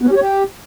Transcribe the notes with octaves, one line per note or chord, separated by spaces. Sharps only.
B3
C#4
G4
C#5
G4